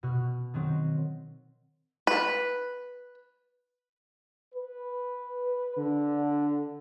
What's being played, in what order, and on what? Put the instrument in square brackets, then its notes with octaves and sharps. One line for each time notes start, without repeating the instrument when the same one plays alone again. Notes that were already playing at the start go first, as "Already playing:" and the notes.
[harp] B2 F#4 F6
D#3 F#3 C4 A#4
[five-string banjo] B4
[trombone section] B4
D3